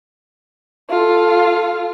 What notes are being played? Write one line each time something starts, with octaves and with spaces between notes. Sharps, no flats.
F4 A4